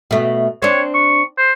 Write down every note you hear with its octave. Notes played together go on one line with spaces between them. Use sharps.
B2 A3
C4 D4 C#5
C#6
C5